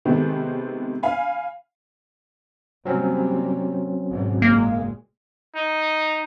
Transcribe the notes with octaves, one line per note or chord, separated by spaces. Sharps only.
C3 D#3 G#3 A3 B3 C4
F5 G#5 B5
C3 F#3 G3 A#3 C4 C#4
G#1 G#2 B2
F#1 A#2 G#3 A#3
D#4